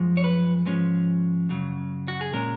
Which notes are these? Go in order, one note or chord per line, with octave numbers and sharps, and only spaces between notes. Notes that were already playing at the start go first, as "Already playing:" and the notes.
Already playing: F#2 F3 G#3
C#5
B4
G#2 F3 G#3 C#4
F#2 C#3 F#3
F#4
G#4
A#2 G#3 C#4 A#4